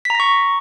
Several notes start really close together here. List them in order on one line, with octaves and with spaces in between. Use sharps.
B6 A#5 A#6 C#6